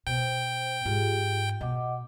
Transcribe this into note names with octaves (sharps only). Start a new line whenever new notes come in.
B2 C5 G5
G#2 F4 G4 G#4
B2 D#5 F#5 D6